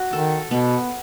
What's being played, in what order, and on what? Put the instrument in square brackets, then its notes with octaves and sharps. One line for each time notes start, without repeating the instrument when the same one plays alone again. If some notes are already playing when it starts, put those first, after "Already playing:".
Already playing: [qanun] F#4
[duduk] D#3 [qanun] A4
[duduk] B2 [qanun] B3